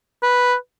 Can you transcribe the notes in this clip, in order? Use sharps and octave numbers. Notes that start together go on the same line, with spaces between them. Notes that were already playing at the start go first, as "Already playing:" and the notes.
B4